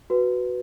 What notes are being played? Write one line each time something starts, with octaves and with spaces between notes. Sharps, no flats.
F#4 B4